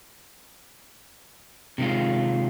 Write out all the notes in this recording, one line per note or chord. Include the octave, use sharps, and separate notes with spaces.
C3 D#3 G#3 F4